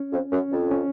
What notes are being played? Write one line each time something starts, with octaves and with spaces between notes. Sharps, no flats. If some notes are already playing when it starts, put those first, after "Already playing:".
Already playing: C#4
F2
F#2 C#4
F2
C#4